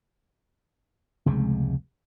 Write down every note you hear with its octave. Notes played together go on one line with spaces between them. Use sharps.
F1 C#2 C3 G#3